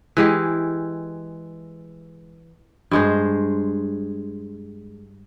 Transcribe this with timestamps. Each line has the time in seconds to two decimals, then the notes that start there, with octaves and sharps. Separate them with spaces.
0.17 E3 G#3 G4
2.91 G2 G#3 C5